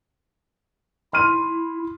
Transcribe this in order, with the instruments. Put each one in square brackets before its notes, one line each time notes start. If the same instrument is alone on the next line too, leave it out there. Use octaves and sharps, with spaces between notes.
[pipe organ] E4 [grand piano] C6 F6 D#7